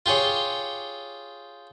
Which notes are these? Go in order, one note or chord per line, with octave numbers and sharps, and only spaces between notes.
F4 G4 G#4 C#5